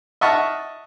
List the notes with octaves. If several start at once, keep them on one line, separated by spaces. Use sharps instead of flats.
D#5 E5 F#5 A5 C#6 F6